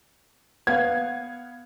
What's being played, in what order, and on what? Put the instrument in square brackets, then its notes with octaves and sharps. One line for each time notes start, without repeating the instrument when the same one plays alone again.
[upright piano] B3 F5 F#5 [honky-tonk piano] G#6